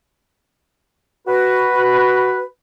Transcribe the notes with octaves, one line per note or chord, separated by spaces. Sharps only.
F#4 B4